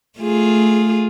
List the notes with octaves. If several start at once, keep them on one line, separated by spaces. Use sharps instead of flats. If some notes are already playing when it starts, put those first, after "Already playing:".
A3 F4 G#4